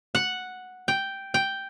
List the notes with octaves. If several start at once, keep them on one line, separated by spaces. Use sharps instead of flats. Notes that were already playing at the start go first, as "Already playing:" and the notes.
F#5
G5
G5